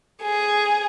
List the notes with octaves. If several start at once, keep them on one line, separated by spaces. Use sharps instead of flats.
G#4